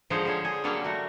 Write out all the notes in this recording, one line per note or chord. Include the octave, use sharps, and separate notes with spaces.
D3 F3 G#3 D#4 C5 C#5
D3 G3 C5 C#5
G#4
D3 F#3 G3 A#3 C#4
A3 F#4